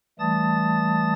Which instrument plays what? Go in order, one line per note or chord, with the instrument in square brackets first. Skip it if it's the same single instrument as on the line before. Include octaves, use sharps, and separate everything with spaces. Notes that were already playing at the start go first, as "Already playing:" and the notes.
[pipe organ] E3 G3 A3 A5 D#6 A6